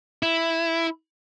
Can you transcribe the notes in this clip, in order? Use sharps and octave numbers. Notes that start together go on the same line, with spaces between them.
E4